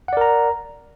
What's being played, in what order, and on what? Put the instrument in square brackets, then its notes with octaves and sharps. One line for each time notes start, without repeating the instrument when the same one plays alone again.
[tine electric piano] F#5
D5
A#4
A#5